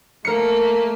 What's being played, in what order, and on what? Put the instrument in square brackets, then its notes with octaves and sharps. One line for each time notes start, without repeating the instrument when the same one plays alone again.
[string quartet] A3 A#3 [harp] A#4 C#7